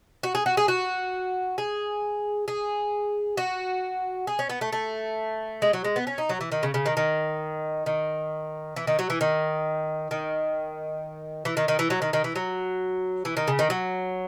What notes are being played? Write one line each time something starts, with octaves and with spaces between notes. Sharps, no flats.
F#4
G#4
F#4
G#4
F#4
G#4
G#4
F#4
G#4
C#4
B3
A3
A3
G#3
F#3
G#3
B3
C#4
D#4
F#3
E3
D#3
C#3
C#3
D#3
D#3
D#3
E3
D#3
F#3
E3
D#3
D#3
E3
D#3
D#3
E3
F#3
D#3
D#3
E3
F#3
E3
D#3
C#3
D#3
F#3